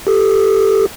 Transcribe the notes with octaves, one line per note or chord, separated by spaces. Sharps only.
G4 A4